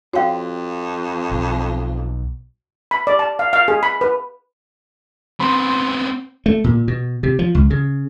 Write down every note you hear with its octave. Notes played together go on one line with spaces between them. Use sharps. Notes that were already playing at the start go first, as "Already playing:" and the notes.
F2 F#4 C#5 F5 G5
B1
B5
D5
A5
F5
F5
G#4
B5
B4
B3 C4 B5 C6
A3
A#2
B2
C3
F3
C#2
C#3